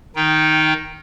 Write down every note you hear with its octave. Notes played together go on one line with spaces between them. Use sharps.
D#3 D#4 G5